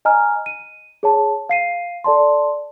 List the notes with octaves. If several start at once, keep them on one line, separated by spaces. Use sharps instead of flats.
D#5 G#5 A#5 F6
D#7
G#4 C#5 A5
F5 C7 D#7
A4 D5 A5 C6